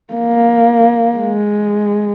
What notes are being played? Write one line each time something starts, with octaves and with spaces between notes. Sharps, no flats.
A#3
G#3